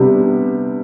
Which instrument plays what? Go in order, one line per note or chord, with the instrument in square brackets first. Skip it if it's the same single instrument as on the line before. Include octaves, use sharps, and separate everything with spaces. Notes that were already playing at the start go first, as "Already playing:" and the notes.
Already playing: [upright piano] C3 G3 B3 D4